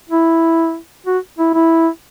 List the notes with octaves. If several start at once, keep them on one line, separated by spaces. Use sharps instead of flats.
E4
F#4
E4
E4